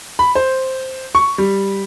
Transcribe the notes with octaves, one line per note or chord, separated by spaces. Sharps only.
B5
C5
C#6
G3